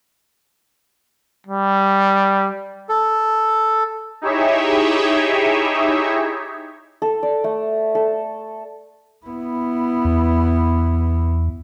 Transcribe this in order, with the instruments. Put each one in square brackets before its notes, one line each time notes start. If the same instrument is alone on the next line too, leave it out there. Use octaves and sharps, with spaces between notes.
[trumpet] G3
[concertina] A4
[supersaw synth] D#4 E4 G4 G#4 C#5 E5
[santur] A4
D5
A3
A4
[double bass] B3 E4
[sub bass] E2